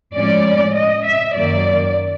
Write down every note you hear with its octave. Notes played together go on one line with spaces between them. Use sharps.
A2 F3 G#3 C#4 D5
D#5
E5
F#2 D#3 F#3 A#3 D5